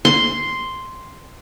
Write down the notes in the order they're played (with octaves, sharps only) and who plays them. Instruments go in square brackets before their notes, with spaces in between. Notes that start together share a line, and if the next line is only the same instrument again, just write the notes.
[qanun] C6